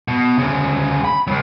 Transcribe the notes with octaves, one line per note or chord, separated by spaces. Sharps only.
B2
D2 C#3
B5
C#2 F#3